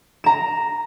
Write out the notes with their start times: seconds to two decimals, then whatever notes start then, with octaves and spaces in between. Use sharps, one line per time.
0.24 A#5 E7